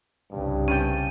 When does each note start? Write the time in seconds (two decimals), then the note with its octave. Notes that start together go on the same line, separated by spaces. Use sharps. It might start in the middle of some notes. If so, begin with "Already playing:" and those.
0.31 C2 G2 C#3
0.68 C#4 D5 G5 D#7